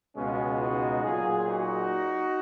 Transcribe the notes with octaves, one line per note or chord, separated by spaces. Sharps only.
C#2 B2 G#3 C#4 F4
D#4 F#4
A#2 F#3 F4 G#4
D#4 F#4